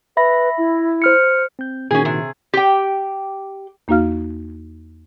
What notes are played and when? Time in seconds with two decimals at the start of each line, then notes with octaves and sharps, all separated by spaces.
0.17 B4 E5 B5 A#6
0.58 E4
1.02 C5 F6 C#7
1.59 C4 G6
1.91 A#2 D#3 C#4 F#4 G#4
2.05 C3 G#4
2.54 G4 G5
3.88 E2 A#3 D#4 F#4 F5 F6